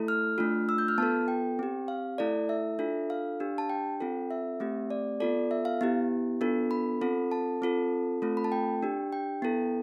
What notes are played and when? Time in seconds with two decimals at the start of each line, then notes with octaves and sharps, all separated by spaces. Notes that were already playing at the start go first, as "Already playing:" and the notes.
Already playing: A3 E4 A4
0.08 F6
0.38 A3 D4 F4
0.69 E6
0.78 G6
0.88 F6
0.98 B3 F4 A4 A5
1.28 G5
1.59 C4 G4
1.88 F5
2.18 A3 E4 A4 D5
2.49 E5
2.79 D4 F4 A4
3.10 F5
3.40 D4 G4
3.58 A5
3.70 G5
4.00 C4 F4 A4
4.31 E5
4.60 A3 C4 G4
4.90 D5
5.20 B3 F4 A4 D5
5.51 E5
5.65 F5
5.81 B3 E4 G4
6.41 B3 D4 F4 A4
6.71 B5
7.01 C4 F4 A4
7.31 A5
7.62 C4 F4 A4
8.22 A3 C4 F4 A4
8.37 B5
8.44 A5
8.52 G5
8.83 D4 G4
9.12 G5
9.42 B3 E4 A4